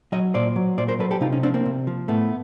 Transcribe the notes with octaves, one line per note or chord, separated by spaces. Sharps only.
F#3 C#5 D#5
A#2 C5 D5
F#3
A#2 C5 D5
A#4 C5
F#3 A4 B4
G4 A4
C3 D#4 F4
C#4 D#4
F3 C4 D4
A#3 C4
C3
F3
A2 A3 B3